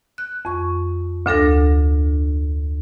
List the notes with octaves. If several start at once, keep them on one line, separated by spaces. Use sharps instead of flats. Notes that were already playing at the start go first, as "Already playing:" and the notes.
F#6
F2 C#6
D2 D4 A4 A#6